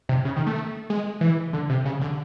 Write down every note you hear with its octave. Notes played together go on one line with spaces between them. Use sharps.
C3
C#3
D#3
A3
G#3
E3
D3
C3
C#3
D3